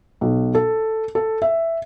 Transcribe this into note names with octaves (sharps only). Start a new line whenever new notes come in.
B1
A4
A4
E5